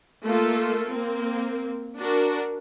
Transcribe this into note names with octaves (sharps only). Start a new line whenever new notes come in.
A3 A#3 F4 A4
A#3 C4
D4 F#4 A#4